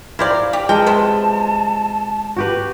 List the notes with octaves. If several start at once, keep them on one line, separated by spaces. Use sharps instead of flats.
E4 G4 A#4 C5 D5 F5
G4 D6
G#3 A#4 B4 G5 A5
C3 F3 B3
F#4 G4 B4